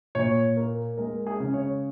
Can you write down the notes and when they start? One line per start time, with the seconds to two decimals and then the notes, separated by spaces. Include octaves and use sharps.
0.15 A#2 C#5
0.57 A#3
0.98 G#3 A#4
1.27 G#4
1.40 C#3
1.54 C#5